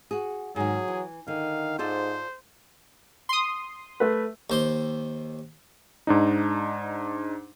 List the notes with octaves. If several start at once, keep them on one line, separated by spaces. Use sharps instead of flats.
F#4 G#4
G#2 D#3 F#3 G#4
E3
D3 D#3 F5
G#2 F4 A4 C5 D5
C6 D#6
A3 B4
D#2 C5 C6
G#2 D4 D#4